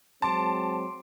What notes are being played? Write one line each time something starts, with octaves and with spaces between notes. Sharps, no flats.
F#3 G#3 C4 A5 C6 D6 D7